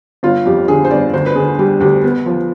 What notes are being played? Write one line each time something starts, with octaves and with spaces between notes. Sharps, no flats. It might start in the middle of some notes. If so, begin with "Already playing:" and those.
G1 F4
F2 G4
D3 G#4
C5
G1 D5
D2 C5
B4
D3 G#4
G3 G4
D2 G4
B3
F3